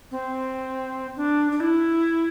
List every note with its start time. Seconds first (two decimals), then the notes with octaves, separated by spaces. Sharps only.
0.11 C4
1.17 D4
1.52 D4
1.60 E4